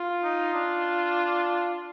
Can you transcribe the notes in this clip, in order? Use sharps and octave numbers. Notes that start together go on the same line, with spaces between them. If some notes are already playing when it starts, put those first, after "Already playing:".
Already playing: F4
D#4
D4